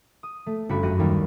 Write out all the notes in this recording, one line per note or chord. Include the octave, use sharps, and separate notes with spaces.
D#6
A3
G1 C#4 D4 F#4 B5 D7
F#2 F#4 G4 F#6 A#6 D#7
D#2 G3 A#3